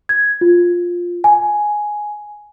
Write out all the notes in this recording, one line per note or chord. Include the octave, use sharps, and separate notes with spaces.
G#6
F4
G#5